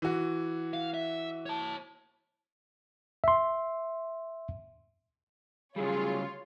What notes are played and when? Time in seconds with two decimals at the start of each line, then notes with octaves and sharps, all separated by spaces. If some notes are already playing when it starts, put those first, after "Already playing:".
0.02 E3 F#4
0.74 F5
0.94 E5
1.46 C#5 A5
3.24 E5 C6
5.76 C#3 F#3 G3 F4 G#4 C#5